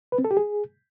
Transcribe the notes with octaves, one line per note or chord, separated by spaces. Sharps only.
B4
C4
A4
G4
G#4